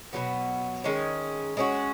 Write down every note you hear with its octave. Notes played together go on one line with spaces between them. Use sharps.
B2 F#3 B3
D#3 G#3 C#4
G#3 C#4 F#4